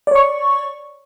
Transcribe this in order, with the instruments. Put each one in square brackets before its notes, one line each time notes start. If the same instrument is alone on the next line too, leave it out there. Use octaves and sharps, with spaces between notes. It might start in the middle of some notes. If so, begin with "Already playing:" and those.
[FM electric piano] D5
C#5
C#6